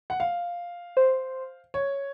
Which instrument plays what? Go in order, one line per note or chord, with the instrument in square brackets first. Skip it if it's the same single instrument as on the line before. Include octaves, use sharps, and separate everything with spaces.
[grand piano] F#5
F5
[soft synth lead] C5
[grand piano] C#5